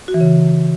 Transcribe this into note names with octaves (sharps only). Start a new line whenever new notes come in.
F#4
E3
C#3